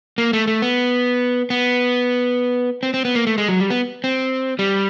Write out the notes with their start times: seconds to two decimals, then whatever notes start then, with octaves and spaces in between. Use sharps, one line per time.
0.18 A#3
0.33 A3
0.47 A3
0.62 B3
1.50 B3
2.83 C4
2.94 C4
3.05 B3
3.15 A#3
3.27 A3
3.38 G#3
3.49 F#3
3.60 G3
3.70 B3
4.04 C4
4.59 G3